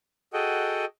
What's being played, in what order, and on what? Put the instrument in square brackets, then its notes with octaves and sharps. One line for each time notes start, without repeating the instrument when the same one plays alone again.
[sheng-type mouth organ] F#4 G#4 A4 D#5 F#5 G5